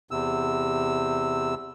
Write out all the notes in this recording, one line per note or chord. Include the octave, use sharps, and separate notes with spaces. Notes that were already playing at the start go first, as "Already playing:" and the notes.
E2 C3 E6